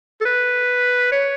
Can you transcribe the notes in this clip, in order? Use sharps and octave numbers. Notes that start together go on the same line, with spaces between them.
A4
B4
C#5